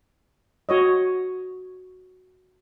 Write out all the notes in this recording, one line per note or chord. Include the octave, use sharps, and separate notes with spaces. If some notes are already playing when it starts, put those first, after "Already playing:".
F#4 C#5 D#5